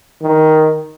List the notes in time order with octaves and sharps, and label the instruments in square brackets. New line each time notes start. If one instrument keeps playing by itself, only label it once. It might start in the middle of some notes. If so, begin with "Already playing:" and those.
[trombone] D#3